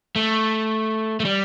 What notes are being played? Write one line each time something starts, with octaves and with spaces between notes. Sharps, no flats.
A3
A3
G3